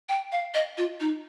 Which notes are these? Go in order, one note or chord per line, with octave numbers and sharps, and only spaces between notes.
G5
F5
D#5
F4
D#4